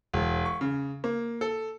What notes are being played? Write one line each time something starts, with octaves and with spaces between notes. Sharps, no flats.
E1
C#6
C#3
A#3
A4